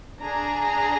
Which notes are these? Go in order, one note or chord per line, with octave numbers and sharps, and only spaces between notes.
D4 G#4 A#5